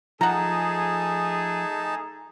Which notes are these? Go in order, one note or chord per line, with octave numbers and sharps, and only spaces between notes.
F3 A3 D#4 G#4 F#5 A5 A#5